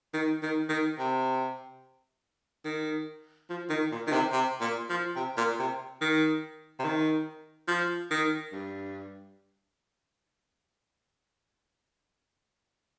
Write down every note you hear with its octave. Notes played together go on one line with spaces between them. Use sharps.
D#3
D#3
D#3
C3
D#3
F3
D#3
A#2
D#3
C3
C3
A#2
F3
C3
A#2
C3
D#3
C3
D#3
F3
D#3
G2